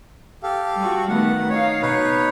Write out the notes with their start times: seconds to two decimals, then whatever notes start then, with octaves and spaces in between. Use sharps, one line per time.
0.43 G4 A4 F5
0.76 G3 F#4
1.09 D#3 A3 B3 F#5
1.50 D#4 C#5 F5
1.82 B2 D#4 B4 C#5